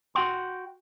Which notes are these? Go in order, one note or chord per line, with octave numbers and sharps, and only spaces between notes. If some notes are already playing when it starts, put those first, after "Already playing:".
F#4 F#5 G5 C6